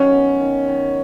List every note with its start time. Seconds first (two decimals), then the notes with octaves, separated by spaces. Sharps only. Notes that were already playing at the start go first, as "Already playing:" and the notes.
Already playing: D#3 F#3 C#4
0.12 B3
0.41 D#3
0.68 D#3